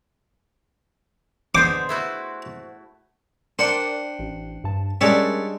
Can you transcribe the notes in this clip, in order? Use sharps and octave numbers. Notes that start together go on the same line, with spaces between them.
B2 D3 G#4 C5 D6
A3 E4 F#4
D4 A#4 C5 D5 F#5 G5 D6
A1
G2 A5
G3 G#3 C#4 D4 A#4 C#5 D5 E5